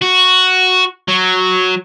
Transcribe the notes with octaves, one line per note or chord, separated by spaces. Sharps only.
F#4
F#3